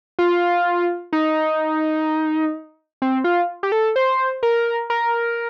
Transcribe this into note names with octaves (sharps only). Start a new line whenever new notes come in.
F4
D#4
C4
F4
G4
A4
C5
A#4
A#4